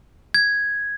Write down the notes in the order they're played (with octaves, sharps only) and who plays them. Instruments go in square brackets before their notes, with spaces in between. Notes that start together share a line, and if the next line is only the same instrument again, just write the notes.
[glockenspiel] G#6